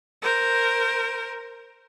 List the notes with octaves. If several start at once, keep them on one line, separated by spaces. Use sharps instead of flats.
A#4 C5